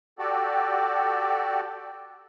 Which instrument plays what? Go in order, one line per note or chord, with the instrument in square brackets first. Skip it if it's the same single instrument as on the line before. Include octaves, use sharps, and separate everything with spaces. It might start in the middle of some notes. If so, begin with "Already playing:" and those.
[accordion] F#4 G4 A4 D5